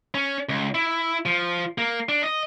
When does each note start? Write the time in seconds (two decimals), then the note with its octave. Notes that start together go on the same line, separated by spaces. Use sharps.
0.14 C#4
0.49 C#2
0.75 E4
1.26 F3
1.78 A#3
2.09 D4
2.23 D#5